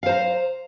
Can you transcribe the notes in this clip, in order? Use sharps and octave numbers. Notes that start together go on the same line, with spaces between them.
C5 F5 A#5